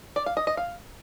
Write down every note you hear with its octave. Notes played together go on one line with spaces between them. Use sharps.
D5
F5
D#5
D#5
F5